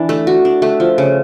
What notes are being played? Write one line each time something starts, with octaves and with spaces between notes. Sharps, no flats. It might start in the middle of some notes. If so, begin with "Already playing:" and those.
Already playing: E3 D4
A3
F#4
D4
A3
F3
C#3